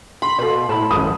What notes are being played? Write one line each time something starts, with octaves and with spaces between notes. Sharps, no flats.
B5 C6
B2 A4 F5
A2 A5 B5
A1 F#2 B4 D#6